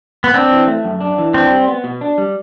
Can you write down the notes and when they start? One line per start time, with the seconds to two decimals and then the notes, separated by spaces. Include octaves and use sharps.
0.24 B3
0.34 C4 D4
0.51 E3
0.67 A3
0.85 F#2
1.00 D4
1.18 E3
1.34 C4 D4
1.50 G3
1.68 B3
1.84 B2
2.01 D4
2.18 G3